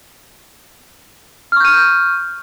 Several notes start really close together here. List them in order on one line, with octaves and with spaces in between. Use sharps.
F6 C#6 G6 D#7